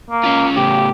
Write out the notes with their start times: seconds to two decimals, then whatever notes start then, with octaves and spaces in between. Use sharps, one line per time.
0.10 A#3
0.24 C#4 F4
0.56 A2 C#3 G4